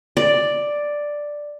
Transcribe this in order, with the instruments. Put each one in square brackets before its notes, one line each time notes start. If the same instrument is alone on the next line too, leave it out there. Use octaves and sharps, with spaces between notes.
[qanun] D5